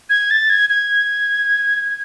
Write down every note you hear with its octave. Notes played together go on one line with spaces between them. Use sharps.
G#6
A6
G#6
G#6